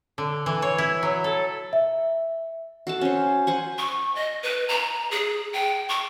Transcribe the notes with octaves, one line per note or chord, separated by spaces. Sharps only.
D3
E3
C#5
E4
F#3
A4
E5
F#4 A4 A5
C#4 C5
C5 F#5 G#5
C#6
D#5
B4
A#5
G#4
G5
C#6